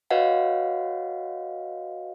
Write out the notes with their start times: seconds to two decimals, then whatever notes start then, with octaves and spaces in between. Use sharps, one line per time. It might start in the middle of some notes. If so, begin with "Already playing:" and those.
0.10 F#4 B4 C#5 D#5 F5 F#5